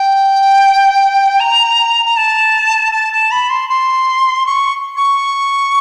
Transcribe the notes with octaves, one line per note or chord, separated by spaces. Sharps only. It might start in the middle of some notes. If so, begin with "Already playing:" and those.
Already playing: G5
A#5
A#5
A5
A5
A5
B5
C6
C6
C#6
C#6